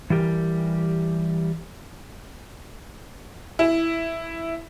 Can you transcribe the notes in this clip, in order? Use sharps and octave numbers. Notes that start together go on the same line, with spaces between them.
E3 G3 G4 A#4
E4